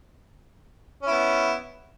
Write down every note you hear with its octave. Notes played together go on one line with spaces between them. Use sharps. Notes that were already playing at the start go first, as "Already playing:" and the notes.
B3 C#4 E4